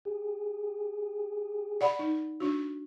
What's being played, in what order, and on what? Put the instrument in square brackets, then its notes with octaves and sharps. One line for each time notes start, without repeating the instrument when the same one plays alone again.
[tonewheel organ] G4 G#4
[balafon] D5 F#5 B5
D#4
D4 F#4